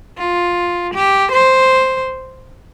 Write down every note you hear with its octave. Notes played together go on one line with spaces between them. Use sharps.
F4
G4
C5